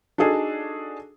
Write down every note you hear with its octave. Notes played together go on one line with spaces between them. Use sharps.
D4 D#4 F#4 G#4 A4